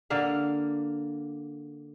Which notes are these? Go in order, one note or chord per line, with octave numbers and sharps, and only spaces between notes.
D3 A#3 F5